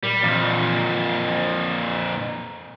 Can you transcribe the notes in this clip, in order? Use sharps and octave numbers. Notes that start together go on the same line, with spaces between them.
A#2 G3
F2 A#2 E3